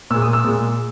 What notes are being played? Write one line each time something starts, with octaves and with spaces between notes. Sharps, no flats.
A#2 G#3 E6
D#6
E6
A#2 G#3